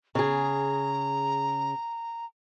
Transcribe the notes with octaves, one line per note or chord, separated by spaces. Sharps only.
C#3 G#4 A#5